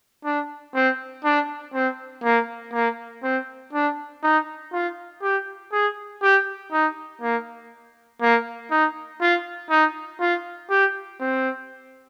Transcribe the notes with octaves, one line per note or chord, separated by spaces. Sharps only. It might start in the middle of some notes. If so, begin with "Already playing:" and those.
D4
C4
D4
C4
A#3
A#3
C4
D4
D#4
F4
G4
G#4
G4
D#4
A#3
A#3
D#4
F4
D#4
F4
G4
C4